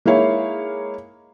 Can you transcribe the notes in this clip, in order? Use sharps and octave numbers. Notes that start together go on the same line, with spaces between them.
G#3 A#3 D#4 E4 C#5 F5